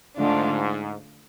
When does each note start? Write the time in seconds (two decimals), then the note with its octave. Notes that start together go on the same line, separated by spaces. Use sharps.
0.18 G#2 D3 A3 D4 F4